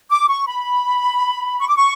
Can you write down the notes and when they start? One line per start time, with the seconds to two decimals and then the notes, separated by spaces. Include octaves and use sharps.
0.10 D6
0.29 C#6
0.47 B5
1.60 C#6
1.68 D6
1.76 C#6